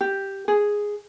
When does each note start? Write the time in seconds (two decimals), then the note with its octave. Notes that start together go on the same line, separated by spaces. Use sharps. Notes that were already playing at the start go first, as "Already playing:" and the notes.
0.01 G4
0.48 G#4